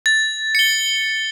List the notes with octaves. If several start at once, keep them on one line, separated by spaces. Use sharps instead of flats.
A6
C#7 G7